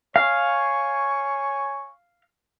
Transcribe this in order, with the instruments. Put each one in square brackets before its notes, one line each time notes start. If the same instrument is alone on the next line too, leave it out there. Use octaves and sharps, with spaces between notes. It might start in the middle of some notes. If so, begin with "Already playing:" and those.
[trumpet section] C#5 G#5 C#6 [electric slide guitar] F5